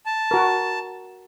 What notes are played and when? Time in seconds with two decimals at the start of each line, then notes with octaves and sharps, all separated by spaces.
0.06 A5
0.31 F#4 A#4